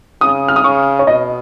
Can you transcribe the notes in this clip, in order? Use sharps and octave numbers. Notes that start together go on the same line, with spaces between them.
C#3 D#6
F6
D#6
C#3 C#6
C#5
B2 D#5